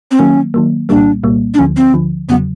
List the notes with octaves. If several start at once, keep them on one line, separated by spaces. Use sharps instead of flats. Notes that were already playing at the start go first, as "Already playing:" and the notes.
C4
D#3 F#3 A#3 C#4
D#3 F#3 A#3
C2 A#2 G3 A#3 D4
C2 A#2 G3 A#3
D4
D2 D3 F3 C#4
C4
D2 D3 F3
E2 C#3 F#3 B3